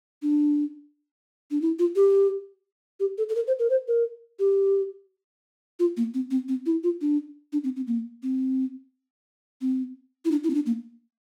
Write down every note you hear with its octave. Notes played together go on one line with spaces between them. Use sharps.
D4
D4
E4
F4
G4
G4
A4
A4
A#4
C5
A#4
C5
A#4
G4
F4
A#3
C4
C4
C4
E4
F4
D4
D4
C4
C4
A#3
C4
C4
E4
D4
E4
C4
D4
A#3